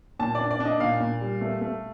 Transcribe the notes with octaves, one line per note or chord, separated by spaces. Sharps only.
A#2 A5
D5
D4
D5
D4
D#5
A#2 F5
A#2
G3
A3
A3